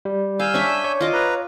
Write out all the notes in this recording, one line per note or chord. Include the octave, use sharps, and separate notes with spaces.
G3
F5 G#5 E6 G6
C#4 D4 E5
C#5
F4 D#5 D6
B4 A#5